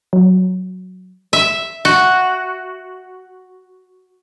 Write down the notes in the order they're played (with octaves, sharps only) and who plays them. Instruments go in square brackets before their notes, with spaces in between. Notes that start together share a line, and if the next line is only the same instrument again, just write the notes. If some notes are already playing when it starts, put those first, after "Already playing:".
[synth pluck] F#3
[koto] E5
F#4